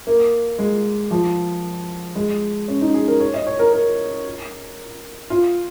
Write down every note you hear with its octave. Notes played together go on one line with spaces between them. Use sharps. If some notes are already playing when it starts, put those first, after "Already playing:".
A#3
G#3
F3
G#3
C#4
D#4
G#4
A#4
C#5
D#5
C#5
A#4
A#4
F4